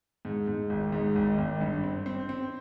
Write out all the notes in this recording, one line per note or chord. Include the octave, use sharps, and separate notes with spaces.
G#2
G#2
G#1
G#2
G#1
G#1
G2
C4
C4
C4